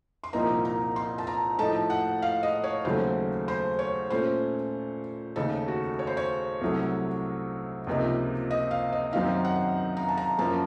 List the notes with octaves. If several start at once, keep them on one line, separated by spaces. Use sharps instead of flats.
C6
C2 A#2 F3 A#3 D#4 A#5
A#5
C6
A5
A#5
A2 F3 A3 D#4 A5
F#5
F5
D#5
C#5
D#2 C#3 F#3 A3 C5
C5
C#5
A#2 A3 C#4 C5
D#2 C#3 A3 D#4 A4
F#4
C#5
C5
C#5
C2 C3 F#3 A3
C#2 C3 F3 A#3 D#4
D#5
F5
D#5
F#2 D#3 F#3 C4 D#4 F5
F#5
A#5
A5
A#5
F#2 F3 A#3 C#4 A5